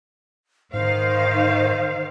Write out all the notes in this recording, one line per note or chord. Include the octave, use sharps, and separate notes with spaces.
G#2 D#3 C5 F5